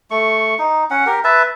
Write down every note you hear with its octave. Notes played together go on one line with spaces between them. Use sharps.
A3 C#6
D#4
C#4 F#5
G4 A#4
B4 E5 A5